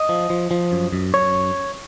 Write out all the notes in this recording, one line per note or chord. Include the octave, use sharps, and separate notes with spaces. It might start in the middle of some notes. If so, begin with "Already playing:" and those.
Already playing: D#5
F3
F3
F3
F#2
F#2
F#2 C#5